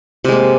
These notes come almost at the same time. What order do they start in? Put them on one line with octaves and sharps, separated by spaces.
C3 G#3 A#3